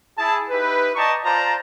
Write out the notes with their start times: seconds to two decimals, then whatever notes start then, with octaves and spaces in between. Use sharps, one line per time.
0.18 E4 G#4 A5
0.50 D#4 E4 G4 B4
0.95 D5 D#5 G5 A5 A#5 C#6
1.24 F4 C5 D5 A5 A#5